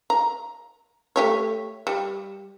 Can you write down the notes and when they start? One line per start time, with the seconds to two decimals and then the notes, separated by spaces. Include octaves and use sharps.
0.10 A#5
1.16 A3 G4 C#5
1.87 G3